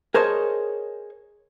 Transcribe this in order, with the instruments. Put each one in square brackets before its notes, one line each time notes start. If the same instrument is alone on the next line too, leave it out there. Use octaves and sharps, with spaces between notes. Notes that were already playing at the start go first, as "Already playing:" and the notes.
[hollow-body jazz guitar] G#4 A#4 C5 C#5 D#5 A5